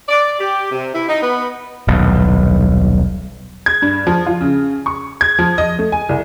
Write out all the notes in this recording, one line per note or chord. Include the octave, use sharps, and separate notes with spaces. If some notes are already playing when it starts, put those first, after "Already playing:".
D5
G4
C3
E4
D#4
B3
D#1 B1
G#6
G2
F3
F4
C#3
C#6
G#6
F3
D#5
A3
G#5
C2